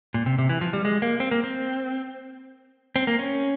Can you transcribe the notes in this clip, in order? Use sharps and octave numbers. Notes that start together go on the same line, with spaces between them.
A#2
C3
C3
E3
F3
G3
G#3
A#3
C4
A#3
C4
C4
A#3
C#4